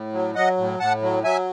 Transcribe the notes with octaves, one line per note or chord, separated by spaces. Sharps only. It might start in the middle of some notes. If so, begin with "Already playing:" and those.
Already playing: A2
F#3
F#3 D#5 F#5
A2
A2 F#5 A5
F#3
F#3 E5 G#5